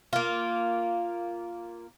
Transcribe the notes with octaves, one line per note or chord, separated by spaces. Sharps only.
A#3 F4